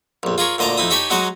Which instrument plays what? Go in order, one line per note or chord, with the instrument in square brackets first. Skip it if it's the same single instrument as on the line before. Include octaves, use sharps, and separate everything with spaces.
[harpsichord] A#1 F2
F4 G#4 A#4 C#5
D2 A#2 D#5 A5 A#5 D6
F2 D#4 E4 D#6
D#4 G4 C#5 G#5 A5 B5
F#3 G#3 D#4 F#4 D#5 F#5